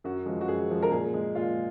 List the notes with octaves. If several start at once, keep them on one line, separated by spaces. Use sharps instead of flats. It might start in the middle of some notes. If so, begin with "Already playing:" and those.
F#2 F#4
F3 G#3
F#4
F#2 G#4
F3 G#3
A#4
A#2 G#4
G#3
A#2 F4